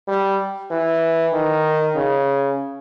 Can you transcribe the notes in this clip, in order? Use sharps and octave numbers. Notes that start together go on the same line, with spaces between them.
G3
E3
D#3
C#3